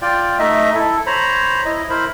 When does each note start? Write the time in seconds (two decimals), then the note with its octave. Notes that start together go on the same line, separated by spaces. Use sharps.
0.02 F4 D5 G5
0.39 A3 D#4 D#5 E5
0.74 E4 A4
1.06 C5 C#5 A#5 B5
1.65 E4 D#5
1.89 E4 A#4 C5 B5